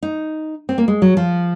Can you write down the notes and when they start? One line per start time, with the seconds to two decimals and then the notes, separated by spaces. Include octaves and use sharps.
0.03 D#4
0.69 C4
0.78 A#3
0.88 G#3
1.02 F#3
1.17 F3